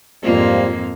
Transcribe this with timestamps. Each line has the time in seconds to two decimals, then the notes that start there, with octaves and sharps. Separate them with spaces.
0.23 F2 G#2 G3 A#3 C4 F4